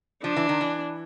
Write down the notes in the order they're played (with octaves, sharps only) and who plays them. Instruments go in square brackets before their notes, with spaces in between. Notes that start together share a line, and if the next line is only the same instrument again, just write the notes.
[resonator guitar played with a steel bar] F3 [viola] D4
[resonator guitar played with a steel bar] E3
D#3
E3